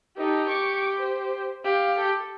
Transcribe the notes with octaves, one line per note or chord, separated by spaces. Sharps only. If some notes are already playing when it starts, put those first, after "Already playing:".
D#4 G4 A4
C#6 D6
C5
G4 F5
A4